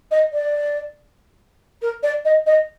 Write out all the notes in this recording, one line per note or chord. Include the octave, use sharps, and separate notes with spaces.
D#5
D5
A#4
D5
D#5
D#5